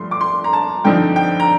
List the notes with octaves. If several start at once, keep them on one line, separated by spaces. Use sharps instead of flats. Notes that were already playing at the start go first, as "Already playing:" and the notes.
Already playing: G2 F3 A3 C6
D6
C6
A#5
A5
G2 D3 F3 C4 D#4 G5
G5
A#5